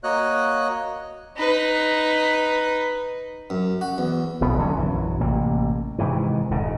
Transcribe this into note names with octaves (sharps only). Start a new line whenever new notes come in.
A#3 F#4 C#5 D#5 F#6
D#4 B4
F#2
F#4
E2
D1 B1 B2 B3
D3 F#3 G3 C#4
A#1 F#2 E3 F#3
A1 C3 A#3
G#2 C3 D#3 E3
D#1 G#2 C#3